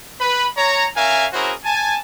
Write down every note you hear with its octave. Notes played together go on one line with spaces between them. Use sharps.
B4 B5
C#5 A#5
C#4 A#4 E5 F5 G#5
C#4 E4 F#4 G#4 A#4 C5
G#5 A5